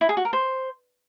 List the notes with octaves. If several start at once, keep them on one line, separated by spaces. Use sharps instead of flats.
E4
G#4
F#4
A#4
C5